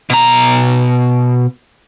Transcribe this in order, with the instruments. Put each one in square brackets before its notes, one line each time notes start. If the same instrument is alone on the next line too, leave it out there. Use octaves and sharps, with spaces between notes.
[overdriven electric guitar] B2 A#5